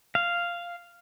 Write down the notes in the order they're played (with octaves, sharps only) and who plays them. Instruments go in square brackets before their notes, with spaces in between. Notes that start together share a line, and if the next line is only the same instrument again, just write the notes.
[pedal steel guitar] F5